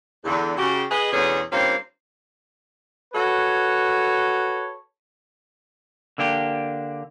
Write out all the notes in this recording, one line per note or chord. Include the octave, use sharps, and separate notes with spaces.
E2 D3
C#3 F#4 G4
G#4 B4 D#5
E2 B2 D3 C#4 G#4
G2 A#3 C4 C#4 F4 F5
F#4 A4 B4 C#5
D3 A#3 D4 G4